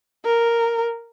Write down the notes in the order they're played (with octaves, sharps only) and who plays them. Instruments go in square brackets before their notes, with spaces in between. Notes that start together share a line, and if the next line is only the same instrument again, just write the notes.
[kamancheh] A#4